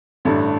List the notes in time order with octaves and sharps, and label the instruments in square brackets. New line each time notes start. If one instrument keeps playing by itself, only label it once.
[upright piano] A1 G2 D3 A3 D4